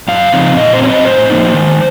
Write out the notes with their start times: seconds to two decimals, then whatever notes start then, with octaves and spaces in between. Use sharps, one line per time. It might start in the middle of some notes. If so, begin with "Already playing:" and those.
0.08 F#2 F5
0.32 C#3 F3 C4 D#4
0.56 A#2 D#5
0.73 C5
0.82 F#3 C4 C#5
0.89 D#5
1.05 A2 C5
1.30 F3 A#3 D#4
1.54 D#3